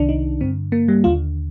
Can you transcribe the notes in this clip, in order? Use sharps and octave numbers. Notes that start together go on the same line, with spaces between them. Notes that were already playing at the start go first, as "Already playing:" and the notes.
Already playing: C2 C3 D#3 D4
D#4
G2 D3 C4
A#3
G3
D#2 D3 F4